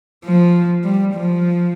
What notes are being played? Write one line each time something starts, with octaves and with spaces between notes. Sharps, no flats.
F3
G3
F3